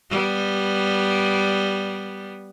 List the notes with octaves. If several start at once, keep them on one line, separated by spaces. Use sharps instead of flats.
G3 B3